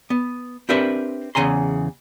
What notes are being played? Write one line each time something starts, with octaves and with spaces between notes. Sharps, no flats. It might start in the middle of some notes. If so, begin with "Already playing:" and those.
B3
C4 D4 G4 A#4 B4 E5
E2 C#3 G#5 A#5 C6